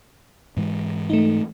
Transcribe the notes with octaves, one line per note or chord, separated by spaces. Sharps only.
G#2 E3 G#3
A3 D#4